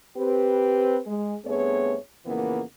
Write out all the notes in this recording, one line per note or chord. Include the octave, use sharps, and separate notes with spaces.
C4 G4 B4
G#3
G2 A3 B3 C4 G#4 C#5
F2 A#2 C#3 E3 A#3 B3